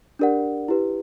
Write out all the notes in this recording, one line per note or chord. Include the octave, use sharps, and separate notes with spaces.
D4 G4 A#4 D5 F#5
E4 G4 B4